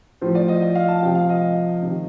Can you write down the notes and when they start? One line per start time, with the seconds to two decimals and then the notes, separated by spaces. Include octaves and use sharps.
0.21 A2 F3 C5
0.35 D5
0.48 D#5
0.62 D#5
0.75 F5
0.88 A5
1.02 C3 F3 G5
1.15 F5
1.29 D#5
1.82 C3 D#3